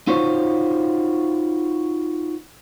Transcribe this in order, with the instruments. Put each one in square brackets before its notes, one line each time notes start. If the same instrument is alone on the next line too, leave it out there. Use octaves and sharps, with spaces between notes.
[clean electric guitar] D#4 F4 F#4 C5 C#5